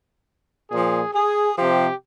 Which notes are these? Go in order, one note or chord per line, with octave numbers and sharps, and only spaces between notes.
A#2 F3 G#4
G#4
C3 F3 G4